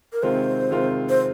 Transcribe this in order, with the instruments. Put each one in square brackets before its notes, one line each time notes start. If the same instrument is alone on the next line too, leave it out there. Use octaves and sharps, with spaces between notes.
[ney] A#4
[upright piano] C3 D#3 G#3 C4 F4 [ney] C5
[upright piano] C3 D#3 G#3 C4 F4
[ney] C5